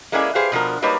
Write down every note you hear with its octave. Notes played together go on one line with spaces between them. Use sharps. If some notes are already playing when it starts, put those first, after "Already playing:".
G#3 A#3 C#4 E4 D5 G#5
G4 G#4 B4 C5 F5
B2 F3 D4 A#4
F#3 G3 A#3 D#4 B4 C#5